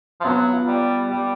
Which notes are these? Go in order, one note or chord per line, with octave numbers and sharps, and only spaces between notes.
F3
F#3 B3
F4
G3
G3 G4